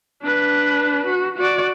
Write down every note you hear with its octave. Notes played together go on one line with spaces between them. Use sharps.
D4 B4
F#4
F#4 D5